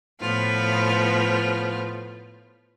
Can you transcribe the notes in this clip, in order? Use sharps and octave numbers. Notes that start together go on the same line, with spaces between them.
A2 F3 B3 F4